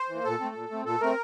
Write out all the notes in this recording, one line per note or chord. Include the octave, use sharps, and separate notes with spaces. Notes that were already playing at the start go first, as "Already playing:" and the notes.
Already playing: C5
E3
A#3
A#2 A4
A3 C4
A#2
A3 C4
A#2 A4
A3 C4 A#4